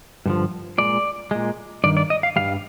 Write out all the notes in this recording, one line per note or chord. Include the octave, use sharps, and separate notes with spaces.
G2 D3 F3
A#2 G#3 D5
A#2 G#3
G2 D#3 D5
D5
D#5
F5
G2 D#3 G3 F5